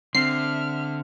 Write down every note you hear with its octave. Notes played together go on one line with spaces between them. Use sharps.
D3 C4 E5 F6 C7 E7